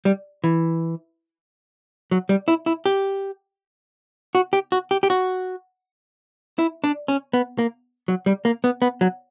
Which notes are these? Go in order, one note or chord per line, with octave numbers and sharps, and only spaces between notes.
G3
E3
F#3
G3
E4
E4
G4
F#4
G4
F#4
G4
G4
F#4
E4
D4
C#4
B3
A#3
F#3
G3
A#3
B3
B3
F#3